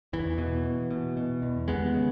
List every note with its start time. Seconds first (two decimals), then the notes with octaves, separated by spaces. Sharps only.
0.13 E2 E3
0.38 B2
0.65 B2
0.91 B2
1.17 B2
1.42 E2
1.68 D#2 G#3 B3
1.94 C#3